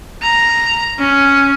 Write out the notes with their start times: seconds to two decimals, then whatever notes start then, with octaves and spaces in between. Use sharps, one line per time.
0.22 A#5
0.99 C#4